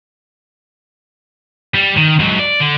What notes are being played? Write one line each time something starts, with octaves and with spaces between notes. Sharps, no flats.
G3
D#3
G#2 F#3
D5
D3